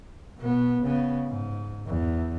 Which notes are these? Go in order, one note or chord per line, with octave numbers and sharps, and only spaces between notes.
B2 B3
C#3 B3
G#2
E2